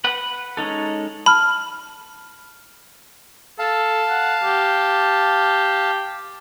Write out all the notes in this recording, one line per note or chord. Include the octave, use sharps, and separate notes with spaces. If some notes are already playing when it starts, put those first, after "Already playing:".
B4 F#5
G#3 C#4 D#4 A4
A5 B5 F6
A4 F5 A5
F#5
G4